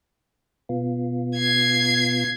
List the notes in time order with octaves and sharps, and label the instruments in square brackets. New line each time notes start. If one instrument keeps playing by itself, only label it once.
[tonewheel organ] B2 B3 F4
[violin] G#6 C7